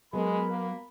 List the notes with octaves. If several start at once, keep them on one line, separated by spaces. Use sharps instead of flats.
F#3 G#3 B3 A#4 B5
A#3